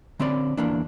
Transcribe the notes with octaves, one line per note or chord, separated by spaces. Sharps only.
D3 C4 C#4 D5
E2 E3 A#3 D4